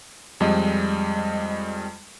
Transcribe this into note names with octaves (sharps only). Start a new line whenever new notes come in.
F2 G3 G#3 D#5